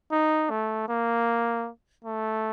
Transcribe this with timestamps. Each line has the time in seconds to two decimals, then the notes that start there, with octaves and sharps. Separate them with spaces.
0.12 D#4
0.50 A3
0.88 A#3
2.04 A3